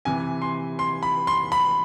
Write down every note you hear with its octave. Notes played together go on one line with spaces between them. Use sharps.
C3 E3 G#5
C6
C6
B5
C6
B5